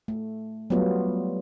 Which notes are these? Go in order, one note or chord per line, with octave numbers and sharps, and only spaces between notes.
A3
F#3 G3 A3 B3 F4